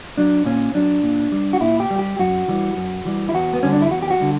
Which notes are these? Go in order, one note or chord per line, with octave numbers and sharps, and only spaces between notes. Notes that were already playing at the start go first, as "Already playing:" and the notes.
F#3 D4
A#2 C#4
F#3 D4
A#2
G3
F#4
A#2 E4
G4
G3
G4
F#2 F#4
E3 G3
F#2
E3 G3
E4
E2 F#4
B3
D3 G3 C#4
D4
E4
E2 F#4
G4
F#4
D3 G3